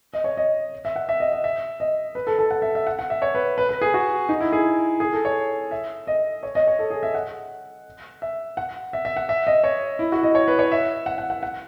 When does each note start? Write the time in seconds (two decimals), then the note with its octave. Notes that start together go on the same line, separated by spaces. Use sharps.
0.14 D#5
0.24 C#5
0.37 D#5
0.85 E5
0.96 F#5
1.09 E5
1.20 D#5
1.32 D#5
1.44 E5
1.80 D#5
2.15 B4
2.27 A4
2.39 A4
2.51 F#5
2.62 E5
2.75 E5
2.87 F#5
2.99 F#5
3.10 E5
3.22 C#5
3.35 B4
3.58 B4
3.69 B4
3.81 G#4
3.94 F#4
4.29 D#4
4.40 E4
4.52 G#4
5.00 G#4
5.13 A4
5.25 C#5
5.71 E5
6.07 D#5
6.43 C#5
6.55 D#5
6.67 C#5
6.79 A4
6.90 G#4
7.03 E5
7.15 F#5
8.22 E5
8.57 F#5
8.93 E5
9.05 E5
9.17 F#5
9.29 E5
9.47 D#5
9.64 C#5
9.99 E4
10.12 F#4
10.23 D#5
10.35 C#5
10.48 B4
10.59 C#5
10.72 E5
11.06 F#5
11.18 F#5
11.30 F#5
11.43 F#5